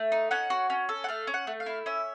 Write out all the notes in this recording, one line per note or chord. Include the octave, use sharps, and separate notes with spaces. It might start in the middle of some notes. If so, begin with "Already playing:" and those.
Already playing: A3
D#4
C#4 F#5
F#4
C#4
A4
F#5
A3 F5
C#4
F#5
A3
F5
E4
C#4 E5